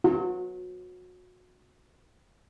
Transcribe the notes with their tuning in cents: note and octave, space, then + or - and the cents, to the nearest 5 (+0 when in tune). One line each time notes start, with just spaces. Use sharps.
F#4 -30